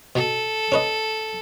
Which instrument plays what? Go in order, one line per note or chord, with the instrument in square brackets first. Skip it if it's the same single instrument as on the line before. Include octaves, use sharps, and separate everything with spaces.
[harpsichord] B2 [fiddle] A4
[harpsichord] C#4 B4 D#5